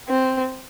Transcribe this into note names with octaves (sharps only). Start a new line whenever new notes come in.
C4